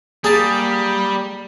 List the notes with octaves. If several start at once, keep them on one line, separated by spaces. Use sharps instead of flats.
G3 A#3 G#4 A5 A#5